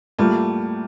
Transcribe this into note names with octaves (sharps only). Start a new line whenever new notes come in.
A2 G3 A3 A#3 F4